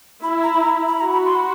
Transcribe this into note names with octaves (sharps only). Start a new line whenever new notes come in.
E4 B5
A#5
B5
A#5
B5
F#4 A#5
B5
C6
B5